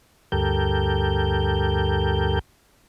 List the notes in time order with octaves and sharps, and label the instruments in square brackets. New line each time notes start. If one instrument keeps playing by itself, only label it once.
[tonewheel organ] D2 G2 G4 A4 A#4 G6